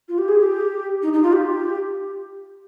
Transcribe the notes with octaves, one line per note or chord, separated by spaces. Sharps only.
F4
G4
G#4
G4
D#4
D#4
F4
G4